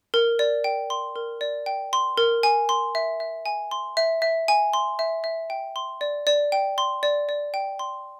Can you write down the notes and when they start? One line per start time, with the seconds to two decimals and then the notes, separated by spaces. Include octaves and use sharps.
0.14 A#4
0.39 D5
0.64 G5
0.90 C6
1.16 A#4
1.41 D5
1.66 G5
1.93 C6
2.18 A#4
2.43 G#5
2.69 C6
2.95 E5
3.20 E5
3.46 G#5
3.71 C6
3.97 E5
4.22 E5
4.48 G#5
4.73 C6
4.99 E5
5.24 E5
5.50 G5
5.76 C6
6.01 D5
6.27 D5
6.52 G5
6.78 C6
7.03 D5
7.29 D5
7.54 G5
7.79 C6